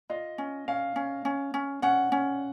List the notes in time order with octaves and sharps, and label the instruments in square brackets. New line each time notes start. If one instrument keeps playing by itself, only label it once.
[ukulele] F4 [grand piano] D#5
[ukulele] C#4
[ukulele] C#4 [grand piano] F5
[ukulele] C#4
C#4
C#4
[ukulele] C#4 [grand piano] F#5
[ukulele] C#4